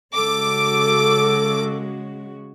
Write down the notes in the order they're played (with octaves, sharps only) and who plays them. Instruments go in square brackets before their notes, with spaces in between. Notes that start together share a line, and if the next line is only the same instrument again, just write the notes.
[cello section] C#3 G#3 F#4 [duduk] A4 [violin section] D6